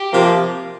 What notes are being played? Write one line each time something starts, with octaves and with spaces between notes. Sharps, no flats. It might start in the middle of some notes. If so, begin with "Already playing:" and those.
Already playing: G4
C3 F3 A#3